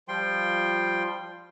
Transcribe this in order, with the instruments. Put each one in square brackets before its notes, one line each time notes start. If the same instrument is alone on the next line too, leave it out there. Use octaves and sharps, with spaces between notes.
[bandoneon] F3 G3 F4 G5 C6